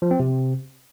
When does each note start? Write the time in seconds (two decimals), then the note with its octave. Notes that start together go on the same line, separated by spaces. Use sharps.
0.02 F3
0.11 C4
0.20 C3